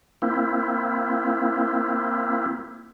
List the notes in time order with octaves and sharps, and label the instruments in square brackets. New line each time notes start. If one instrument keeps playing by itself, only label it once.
[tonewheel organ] A#3 C4 E4